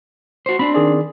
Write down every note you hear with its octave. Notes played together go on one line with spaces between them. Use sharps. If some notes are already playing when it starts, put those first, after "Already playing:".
F#4 C5
C4 D4 B5
D#3 G#4 D5